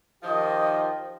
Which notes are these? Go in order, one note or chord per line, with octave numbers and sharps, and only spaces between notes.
D#3 F3 G4 D#5